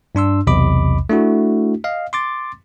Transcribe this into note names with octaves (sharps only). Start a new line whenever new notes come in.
G2 D4 C6 E6
B1 E2 C3 D#5 B5 D6
A3 D4 E4 F#4
D#5 F5
C6 D6 A6